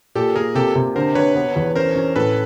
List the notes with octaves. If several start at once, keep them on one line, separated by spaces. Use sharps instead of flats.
A#2 G4 A4
A#3 G#4 A#4
C3 G4 A4
C3
D3 A#4 C5
D3 B4 C#5
B3
E2
C#4 A#4 C5
C#4
A2 A4 B4